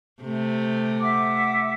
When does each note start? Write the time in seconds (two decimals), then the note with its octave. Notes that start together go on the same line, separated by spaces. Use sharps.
0.22 C3 A3
1.01 E5 F#5 D6